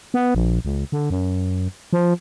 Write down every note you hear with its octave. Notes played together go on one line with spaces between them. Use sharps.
B3
A#1
C#2
D3
F#2
F3